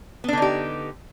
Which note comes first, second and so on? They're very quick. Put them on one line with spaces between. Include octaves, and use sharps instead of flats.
B3 D4 D3 D#4 G4